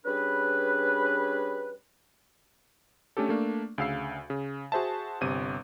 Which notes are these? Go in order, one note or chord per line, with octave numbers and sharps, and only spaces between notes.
G3 C#4 D4 G#4 B4
A3 C#4 D4 G4 A4
A3 A#3 D4
D2 C#3 F5 E6 C7
C#3
F#4 G#4 C5 E5 A5
G1 C3 D#7